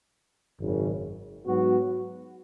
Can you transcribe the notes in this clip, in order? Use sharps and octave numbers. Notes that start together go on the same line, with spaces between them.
G#1 F#2 C#3
G#2 F#3 B3 F#4